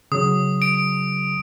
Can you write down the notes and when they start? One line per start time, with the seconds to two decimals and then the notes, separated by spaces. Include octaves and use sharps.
0.12 C#3 F#3 D#6
0.62 D7